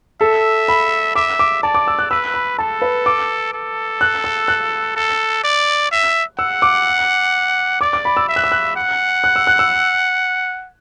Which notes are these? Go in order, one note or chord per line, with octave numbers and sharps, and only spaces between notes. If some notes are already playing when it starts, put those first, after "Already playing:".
A4 E5
B5
E5 D6
D6
D5 A5
D6
E6
F#6
B4 E6
B5
A4 A5
B4
D6
A4
F#6
E6
F#6
A4
D5
E5
F#5 E6
D6
D5 D6
D6
B5
E6
E5
F#6
E6
F#6
F#5
F#6
E6
F#6
E6